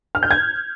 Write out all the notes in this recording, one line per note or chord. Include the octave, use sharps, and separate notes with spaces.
F6
G6
G#6